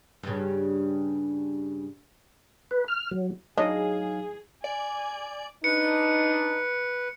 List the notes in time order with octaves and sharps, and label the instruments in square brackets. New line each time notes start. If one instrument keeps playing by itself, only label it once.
[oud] G2 C#3
[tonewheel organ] B4
F6
F#3
[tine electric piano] F#3 D#4 F5 [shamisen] D4 C#5 [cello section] G#4 [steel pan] D#5
[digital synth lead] D5 [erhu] G#5
[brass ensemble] D4 D#4 [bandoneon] B4 [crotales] C#7